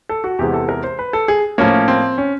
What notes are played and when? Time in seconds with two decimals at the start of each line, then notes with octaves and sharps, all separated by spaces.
0.09 A4
0.24 F#4
0.39 E2 C3 E3 G#3 G4
0.54 A4
0.69 A#4
0.84 C5
0.99 B4
1.13 A4
1.28 G#4
1.58 A2 F3 A#3 C#4
1.88 C4
2.18 C#4